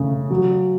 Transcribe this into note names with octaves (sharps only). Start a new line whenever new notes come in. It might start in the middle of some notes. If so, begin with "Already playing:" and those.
Already playing: C#3 A3
F#3